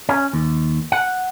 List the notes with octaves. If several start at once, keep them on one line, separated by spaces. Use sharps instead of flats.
C#4
D#2
F#5